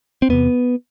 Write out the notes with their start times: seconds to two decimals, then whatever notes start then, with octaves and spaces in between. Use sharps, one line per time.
0.22 C4
0.29 E2 C3 B3